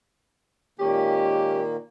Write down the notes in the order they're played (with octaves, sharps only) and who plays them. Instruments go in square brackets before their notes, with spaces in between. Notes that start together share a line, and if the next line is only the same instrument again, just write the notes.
[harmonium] A#2 D#3 A#3 [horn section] G#3 C#4 G4